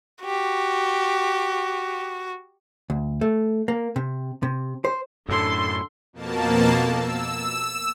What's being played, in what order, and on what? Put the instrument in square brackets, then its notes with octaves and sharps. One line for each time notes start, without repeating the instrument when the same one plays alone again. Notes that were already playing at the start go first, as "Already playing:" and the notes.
[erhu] F#4 [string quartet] G4
[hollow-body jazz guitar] D2
A3
A#3
C3
C3
C5
[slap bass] F#2 A2 [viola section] D3 A4 C6
[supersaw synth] F2 B2 A#3 A5
E6